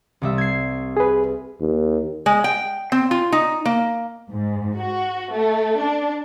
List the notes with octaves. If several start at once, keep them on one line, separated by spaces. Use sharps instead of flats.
C2 G3 E5
G#6 C7
G#4 B4
D#2
G#3
G5
C4
F4
D#4
A#3
G#2
F#4
A3
D4